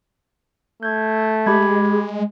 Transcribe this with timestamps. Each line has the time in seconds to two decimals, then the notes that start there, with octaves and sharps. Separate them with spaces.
0.83 A3 G6 G#6
1.46 G#3 G4 B5 G#6